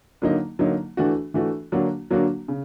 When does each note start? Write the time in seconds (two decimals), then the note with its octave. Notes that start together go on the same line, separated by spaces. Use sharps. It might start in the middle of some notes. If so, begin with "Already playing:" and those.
0.22 D3 F#3 A#3 D#4
0.59 D3 F#3 A#3 D#4
0.97 E3 A3 D4 F#4
1.34 E3 A3 D4 F#4
1.72 D3 F#3 A#3 D4 F#4
2.11 D3 F#3 A#3 D4 F#4
2.48 C#3